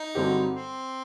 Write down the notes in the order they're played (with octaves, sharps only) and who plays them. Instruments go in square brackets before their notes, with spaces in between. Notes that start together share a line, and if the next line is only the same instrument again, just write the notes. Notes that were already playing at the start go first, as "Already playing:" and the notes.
Already playing: [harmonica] D#4
[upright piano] G2 D3 F#3 C4 G4
[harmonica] C4